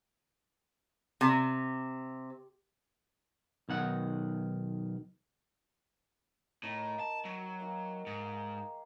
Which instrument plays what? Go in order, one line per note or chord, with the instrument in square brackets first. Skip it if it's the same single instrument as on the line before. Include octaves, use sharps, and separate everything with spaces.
[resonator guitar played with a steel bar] C3
[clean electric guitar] B1 D#3 F#5
[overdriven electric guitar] A2 [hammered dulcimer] D#3 D#4
[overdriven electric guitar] A5
F#3
[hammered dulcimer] D#3 A#3
[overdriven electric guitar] G#2 [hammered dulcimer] G#4